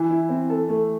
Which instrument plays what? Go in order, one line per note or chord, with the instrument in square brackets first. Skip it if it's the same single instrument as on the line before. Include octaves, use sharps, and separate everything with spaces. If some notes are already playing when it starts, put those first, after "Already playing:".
Already playing: [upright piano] E3
[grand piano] E4
C4
A4
A3